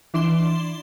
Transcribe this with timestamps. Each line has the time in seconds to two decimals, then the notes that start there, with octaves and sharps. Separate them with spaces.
0.14 E3 D4 D5 C6 E7 G7